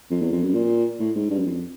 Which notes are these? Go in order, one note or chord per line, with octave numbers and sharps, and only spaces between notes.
F2
E2
F2
F#2
A#2
A2
G#2
G2
F#2
F2